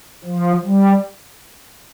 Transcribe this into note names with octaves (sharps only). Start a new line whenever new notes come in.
F3
G3